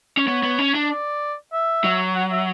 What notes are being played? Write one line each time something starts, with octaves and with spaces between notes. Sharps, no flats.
C#4
B3 C#5
B3
C#4
D4
D5
E5
F#3
F#5
E5